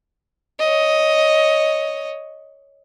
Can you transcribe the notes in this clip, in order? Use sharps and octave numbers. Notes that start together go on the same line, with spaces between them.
C#5 D#5